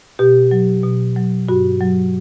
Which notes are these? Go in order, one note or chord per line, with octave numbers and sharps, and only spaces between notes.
B2 G4
F#3
B2
F#3
G2 F#4
F#3